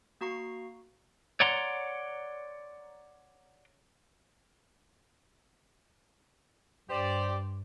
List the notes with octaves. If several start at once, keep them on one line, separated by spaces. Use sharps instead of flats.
A#3 F#4 A#5 C#6 C7
C#5 D5 F#5 A#5 C6
G2 G4 C5 D5